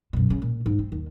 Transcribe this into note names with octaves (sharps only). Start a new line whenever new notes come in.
F#2 B2
C#3
A#2
G#2 D#4
C4
D#2 D#3